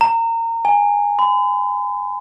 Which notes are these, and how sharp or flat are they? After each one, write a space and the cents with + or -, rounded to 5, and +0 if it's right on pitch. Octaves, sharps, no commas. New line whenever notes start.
A#5 -25
G#5 -10
B5 +45